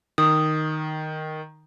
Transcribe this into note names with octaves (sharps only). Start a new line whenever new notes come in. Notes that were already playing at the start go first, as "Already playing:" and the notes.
D#3 D#6